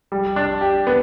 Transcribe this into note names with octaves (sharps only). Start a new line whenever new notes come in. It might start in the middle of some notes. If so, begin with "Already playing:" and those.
G3
D4
G4
B3